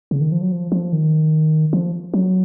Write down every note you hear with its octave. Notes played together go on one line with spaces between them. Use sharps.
C#3
D#3
F3
F#3
F3
F3
D#3
F3
F#3